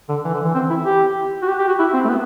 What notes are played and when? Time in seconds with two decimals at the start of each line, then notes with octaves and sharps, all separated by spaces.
0.09 D3
0.24 E3
0.34 D3
0.44 E3
0.54 C4
0.70 E4
0.85 G4
1.42 F#4
1.48 G4
1.58 G4
1.68 F#4
1.79 E4
1.93 C4
2.05 A3
2.09 B3